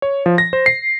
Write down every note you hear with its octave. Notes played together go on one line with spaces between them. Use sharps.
C#5
F3
A#6
C5
C7